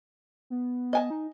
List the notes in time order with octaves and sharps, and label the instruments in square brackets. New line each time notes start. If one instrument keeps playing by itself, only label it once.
[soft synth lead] B3
[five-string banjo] D#5 G#5 A5
[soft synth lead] D#4